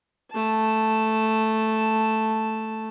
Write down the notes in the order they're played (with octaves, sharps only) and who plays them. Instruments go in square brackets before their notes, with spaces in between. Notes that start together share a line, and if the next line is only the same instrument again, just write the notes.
[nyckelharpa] A3 A5